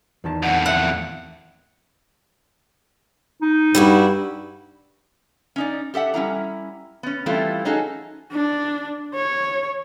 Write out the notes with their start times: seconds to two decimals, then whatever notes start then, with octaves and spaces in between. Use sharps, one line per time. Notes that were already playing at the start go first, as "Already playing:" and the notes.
0.24 E2 D#3 A5
0.43 F2 A2 F#5
0.66 E5 F#5
3.42 D#4
3.75 G2 G3 E4 F#4
5.56 C#4 D#4 D5
5.94 G4 A4 E5 F#5
6.14 G3 C#4 E4 A#5
7.03 B3 C#4
7.26 E3 G3 A3 C4 E4 F4
7.65 C#4 D#4 F#4 G#4 A4
8.32 D4
9.15 C#5